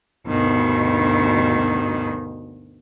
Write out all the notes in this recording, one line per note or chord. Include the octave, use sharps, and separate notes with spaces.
D2 G2 B2 D#3